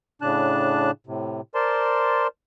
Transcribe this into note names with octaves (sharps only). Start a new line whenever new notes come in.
A2 C#3 D4 A5 F#6
A2 C3
A#4 C5 D5 A5 C6